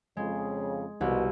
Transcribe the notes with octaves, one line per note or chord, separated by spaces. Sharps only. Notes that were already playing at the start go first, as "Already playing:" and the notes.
F2 C#3 G#3
C2 B2 F#4